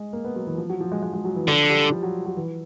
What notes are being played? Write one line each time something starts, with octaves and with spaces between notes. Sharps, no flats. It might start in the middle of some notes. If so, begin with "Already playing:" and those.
Already playing: G#3
A#3
B3
F#3
E3
F3
F#3
F3
G#3
G#3
G#3
F#3
E3
D3 F3
G3
F3
F#3
F#3
E3